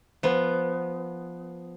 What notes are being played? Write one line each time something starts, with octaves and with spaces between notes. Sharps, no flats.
F3 B3